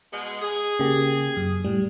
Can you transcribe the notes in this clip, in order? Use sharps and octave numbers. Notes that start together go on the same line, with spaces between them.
B2 G#3
G#4
C#3 A#3 G4
F#2
A2 G3